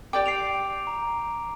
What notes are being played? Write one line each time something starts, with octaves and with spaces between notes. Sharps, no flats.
G4 D5 G5 D6
C7 D7 F7
A#5